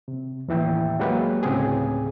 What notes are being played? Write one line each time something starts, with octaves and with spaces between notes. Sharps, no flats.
C3
D#2 A2 E3 E5 G5
F#3 G#3 A#3 F#4 G4 B4
D2 A2 C#3 C4 G4 G#4